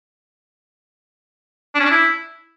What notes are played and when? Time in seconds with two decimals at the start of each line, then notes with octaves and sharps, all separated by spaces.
1.74 D4
1.80 C#4
1.85 D4
1.90 E4